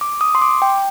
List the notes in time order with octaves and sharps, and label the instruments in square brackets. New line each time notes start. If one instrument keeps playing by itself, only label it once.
[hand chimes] D6
D#6
C6
D6
G5